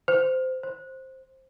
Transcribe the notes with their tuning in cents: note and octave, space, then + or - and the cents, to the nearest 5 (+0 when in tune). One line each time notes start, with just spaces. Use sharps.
C5 -15
C5 +10